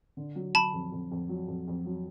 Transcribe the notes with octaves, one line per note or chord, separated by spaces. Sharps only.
D3
F#3
F#3 A5 B5
F2
F2
F2
F#3
F2
F2
F#3